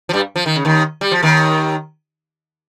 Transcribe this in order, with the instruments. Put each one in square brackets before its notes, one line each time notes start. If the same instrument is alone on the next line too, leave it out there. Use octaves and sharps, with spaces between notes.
[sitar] F3
G2 G3
F3
D#3
C#3
D#2 D#3
G3
F3
D#2 D#3